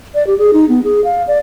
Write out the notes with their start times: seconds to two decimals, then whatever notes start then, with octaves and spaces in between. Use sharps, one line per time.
0.15 D5
0.27 G4
0.38 G#4
0.53 D#4
0.69 B3
0.84 G#4
1.04 F5
1.27 D5